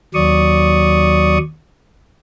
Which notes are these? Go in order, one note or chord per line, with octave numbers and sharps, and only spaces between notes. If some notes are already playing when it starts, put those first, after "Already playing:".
D#2 F#3 D5 C#6 D#6